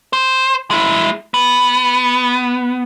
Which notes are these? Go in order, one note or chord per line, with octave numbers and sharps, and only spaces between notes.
C5
G#3 E4
B3